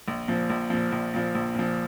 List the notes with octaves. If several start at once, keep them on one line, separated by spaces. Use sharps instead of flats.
A#1
A#2 F3
A#1
A#2 F3
A#1
A#2 F3
A#1
A#2 F3